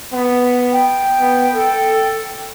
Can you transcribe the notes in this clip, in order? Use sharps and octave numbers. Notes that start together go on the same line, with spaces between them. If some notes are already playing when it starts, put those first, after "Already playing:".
B3
G5
B3
A4